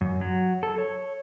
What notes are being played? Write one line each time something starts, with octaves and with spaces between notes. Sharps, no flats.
F#2
F#3
A4
C#5